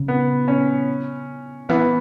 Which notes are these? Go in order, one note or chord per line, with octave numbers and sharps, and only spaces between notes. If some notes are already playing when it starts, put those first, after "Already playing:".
Already playing: C#3
B3
C#4
E3 B3